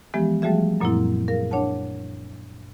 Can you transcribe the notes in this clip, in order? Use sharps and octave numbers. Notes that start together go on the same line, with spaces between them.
E3 F3 G#3 B3 G4
F3 G3 A3 F#4 G#4 E5
F#2 A#2 F#3 A#3 C4 E4
G#4 A#4 F5
D4 C#5 F#5 A5